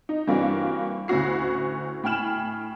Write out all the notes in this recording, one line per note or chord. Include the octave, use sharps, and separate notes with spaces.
D#4
G2 E3 A#3 C4 D4 F#4
D2 A2 C#4 F#4 C7
A2 G5 G#5 F6 E7 F#7